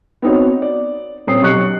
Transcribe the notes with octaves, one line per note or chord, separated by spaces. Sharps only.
B3 C4 D#4 F#4 C#5
D5
D#1 C4 C#4 D#6 C7
B1 G4 C#6 F#6 C#7